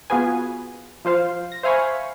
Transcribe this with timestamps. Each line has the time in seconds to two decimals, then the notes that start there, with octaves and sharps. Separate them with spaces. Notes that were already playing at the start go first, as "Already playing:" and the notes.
0.10 B3 F4 F#4 G#4 B4 G#5
1.05 F3 F4 C5 F5
1.52 A#6
1.63 C5 E5 F5 G#5 B5 C#6